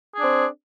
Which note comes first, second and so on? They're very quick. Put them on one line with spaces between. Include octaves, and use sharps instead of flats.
G#4 D4 C4